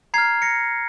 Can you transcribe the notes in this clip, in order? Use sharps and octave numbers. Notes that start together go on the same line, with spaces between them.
A#5 F6 G#6 C7
A#6 C#7